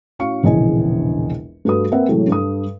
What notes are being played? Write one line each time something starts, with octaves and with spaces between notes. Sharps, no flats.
A2 C#4 F#4 F5 C#6 C#7
E1 A#1 E2 C#3 D#5 G#5
G2 A3 F#4 A4 B4 D#6
A#3 C4 A#4 B4 E5 F#5
A2 C3 E3 F#3 G#3 A3
G2 A4 D#6